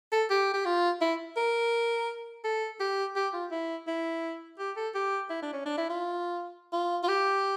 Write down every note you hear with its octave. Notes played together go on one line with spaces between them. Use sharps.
A4
G4
G4
F4
E4
A#4
A4
G4
G4
F4
E4
E4
G4
A4
G4
E4
D4
C#4
D4
E4
F4
F4
F4
G4